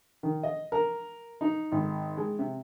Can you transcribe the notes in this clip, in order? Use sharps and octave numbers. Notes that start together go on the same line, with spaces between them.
D#3
D#5
A#4
D#4
G#1
G#3
C3